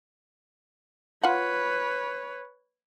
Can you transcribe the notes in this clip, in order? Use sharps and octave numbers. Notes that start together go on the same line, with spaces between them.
F4 B4 C#5 F#5